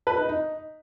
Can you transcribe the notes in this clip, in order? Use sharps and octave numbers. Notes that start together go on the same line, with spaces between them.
B4
D#4
D#4